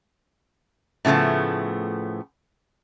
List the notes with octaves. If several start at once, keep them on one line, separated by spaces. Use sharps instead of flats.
A2 C#3 F3 A3 B3